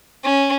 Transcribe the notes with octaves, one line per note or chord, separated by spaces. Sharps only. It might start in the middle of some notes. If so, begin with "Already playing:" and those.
C#4